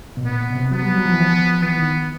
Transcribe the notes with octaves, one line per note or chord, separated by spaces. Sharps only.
B2
A#2 B3
B2
C3
F#3 B3
G3
F#3
F3
E3
F3
E3 B3
D#3